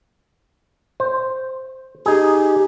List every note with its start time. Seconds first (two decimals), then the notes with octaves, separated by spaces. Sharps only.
1.00 C5
2.06 D#4 G4 G#4